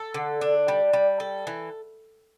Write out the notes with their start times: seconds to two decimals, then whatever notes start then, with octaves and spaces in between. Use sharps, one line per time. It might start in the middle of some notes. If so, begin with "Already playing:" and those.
Already playing: A4
0.14 D3
0.41 D4
0.68 G3
0.93 G3
1.20 A4
1.47 E3